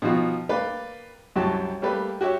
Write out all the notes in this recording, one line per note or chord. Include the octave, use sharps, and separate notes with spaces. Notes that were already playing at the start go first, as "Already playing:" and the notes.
B2 D#3 F3 F4 F#4
A#3 B4 D5 F5 G5
C2 F#2 F#4 G4 A5
G3 A3 A#3 G4 B4
F#4 G4 C#5 E5